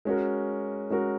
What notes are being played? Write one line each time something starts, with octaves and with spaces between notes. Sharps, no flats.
G#3 C#4 F#4 A#4
G#3 C#4 F#4 A#4